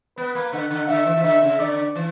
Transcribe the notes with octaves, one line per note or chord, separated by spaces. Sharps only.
B3 B4
A#3
D3 F#5
D3
D3 E5
E3
E3
D3 E5
C#3
D3 D5
E3